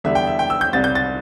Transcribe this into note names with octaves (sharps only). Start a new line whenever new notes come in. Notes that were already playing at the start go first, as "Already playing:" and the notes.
E2 D3 G3 E5
G5
E5
G5
E6
G6
C2 C3 G3 A6
G6
A6